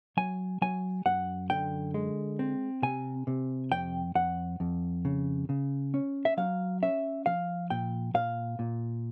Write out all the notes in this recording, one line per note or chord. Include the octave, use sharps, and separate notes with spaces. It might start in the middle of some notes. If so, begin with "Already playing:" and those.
F#3 G#5
F#3 G#5
F#2 F#5
D3 G5
G#3
C4
C3 G#5
C3
F2 G5
F2 F#5
F2
C#3
C#3
C#4
E5
F#3 F5
C#4 E5
F3 F5
A#2 G5
A#2 F5
A#2